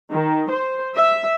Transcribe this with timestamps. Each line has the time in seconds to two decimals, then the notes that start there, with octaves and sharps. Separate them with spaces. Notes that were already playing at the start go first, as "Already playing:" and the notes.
0.12 D#3
0.51 C5
0.97 E5